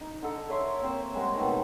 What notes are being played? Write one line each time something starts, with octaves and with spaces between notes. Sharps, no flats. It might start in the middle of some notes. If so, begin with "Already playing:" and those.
D#4
D3 D#4 A4
A#4 C#5 E5 C6
A#3 C4 C5 C#5
G3 G#3 F#4 A#4
B2 D#3 A3